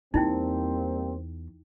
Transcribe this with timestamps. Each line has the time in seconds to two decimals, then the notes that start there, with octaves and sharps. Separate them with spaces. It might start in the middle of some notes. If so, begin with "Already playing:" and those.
0.14 E2 G3 A#3 C4 D#4 E4 G5